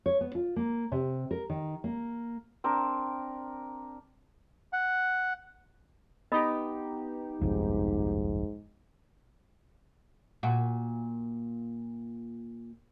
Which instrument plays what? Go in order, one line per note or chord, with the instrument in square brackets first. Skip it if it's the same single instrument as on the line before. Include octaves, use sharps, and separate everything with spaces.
[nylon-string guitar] C#5
B3
F4
A#3
C3
A#4
D#3
A#3
[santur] C4 D4 A#4
[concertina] F#5
[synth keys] B3 D#4 G4 [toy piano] D#5 B5 D#6
[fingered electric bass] G1 C2 F2 [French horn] G#2
[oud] A#2 F#4